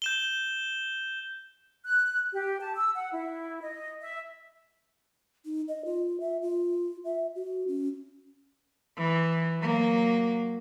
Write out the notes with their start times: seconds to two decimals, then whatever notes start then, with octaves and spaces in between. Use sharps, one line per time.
0.02 G6 E7 G7
1.85 F#6
2.32 G4
2.60 A5
2.76 E6
2.95 F#5
3.13 E4
3.61 D#5
4.02 E5
5.45 D#4
5.68 D#5
5.85 F4
6.20 E5
6.42 F4
7.05 E5
7.35 F#4
7.68 C#4
8.97 E3
9.59 F#3 A#3